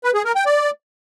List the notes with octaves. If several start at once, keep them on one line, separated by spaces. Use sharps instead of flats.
B4
G#4
A#4
G5
D5